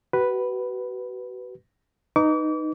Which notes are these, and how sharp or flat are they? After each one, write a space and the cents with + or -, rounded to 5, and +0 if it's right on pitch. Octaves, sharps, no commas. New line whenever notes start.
F#4 +35 B4 +0
D#4 -5 B4 +0 D6 -35